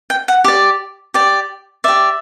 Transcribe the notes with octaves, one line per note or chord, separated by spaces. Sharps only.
G5
F#5
G4 D5
G4 D5
G4 D5 E5